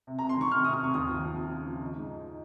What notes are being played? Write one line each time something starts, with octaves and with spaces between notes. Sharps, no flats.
C3
A#5
C3
C6
D#3 C#6
C3 F6
C3 D#6
F6
C3 C#6
D#2 D#6
F3
F3
F3
C#3
F3
D#4
G#2
D#4